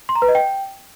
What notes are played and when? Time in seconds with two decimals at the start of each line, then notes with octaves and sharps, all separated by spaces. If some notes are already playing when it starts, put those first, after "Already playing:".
0.09 C6
0.15 A#5
0.22 B4
0.28 D#5
0.35 G5